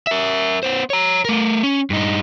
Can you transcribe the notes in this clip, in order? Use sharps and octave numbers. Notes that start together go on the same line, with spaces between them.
A#4 E5
B3 C5
C#5 A#5
A3 A#4
C#4
G2 D#4